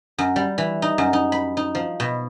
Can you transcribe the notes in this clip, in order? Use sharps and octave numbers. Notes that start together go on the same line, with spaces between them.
F#2
G3
E3
D#4
F#2
D#4
B5
D#4
F3
B2